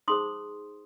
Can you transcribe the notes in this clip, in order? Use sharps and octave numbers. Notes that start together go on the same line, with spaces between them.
D#4 G#4 C5 C6 D#6